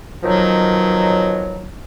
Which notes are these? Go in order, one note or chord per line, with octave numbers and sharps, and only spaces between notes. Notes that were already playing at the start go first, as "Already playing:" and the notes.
B2 D#3 F3 F#3